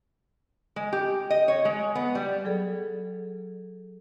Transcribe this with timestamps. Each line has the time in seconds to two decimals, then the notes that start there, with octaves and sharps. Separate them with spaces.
0.76 G#3
0.93 G4
1.30 D#5
1.48 C#5
1.65 G#3
1.95 B3
2.15 G3
2.45 F#3 G#4 A4